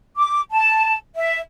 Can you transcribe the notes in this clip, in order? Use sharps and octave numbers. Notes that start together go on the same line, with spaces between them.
D6
A5
E5